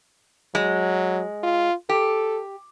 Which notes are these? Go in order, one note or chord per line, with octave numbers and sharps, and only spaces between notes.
F#3 G#3
F4
G4 A4